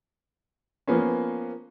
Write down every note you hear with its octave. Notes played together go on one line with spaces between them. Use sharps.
F3 A#3 B3 C#4